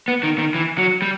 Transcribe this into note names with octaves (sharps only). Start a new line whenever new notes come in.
B3
D#3
D#3
E3
F#3
G3